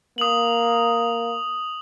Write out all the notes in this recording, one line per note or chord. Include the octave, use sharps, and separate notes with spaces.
A#3 D#6 F#7